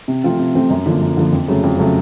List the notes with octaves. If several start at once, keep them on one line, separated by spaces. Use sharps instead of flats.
C3
F3 A3 C4 F4
C3
F3 A3 C4 F4
F#2
D3 F3 A#3
F#2
D3 F3 A#3
F2
C#3 F#3 A3
F2
C#3 F#3 A3